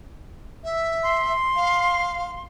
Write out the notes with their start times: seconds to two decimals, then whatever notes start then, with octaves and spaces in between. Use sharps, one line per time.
0.64 E5
1.03 C6
1.56 F5